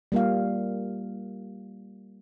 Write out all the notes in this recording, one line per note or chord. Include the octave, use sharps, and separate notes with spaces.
G3 A#3 F4 F5